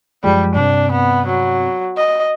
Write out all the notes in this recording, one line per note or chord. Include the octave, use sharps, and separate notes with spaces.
F#2 F3 G3 G#3
G2 C3 C4 D4
B3
F#3
D#5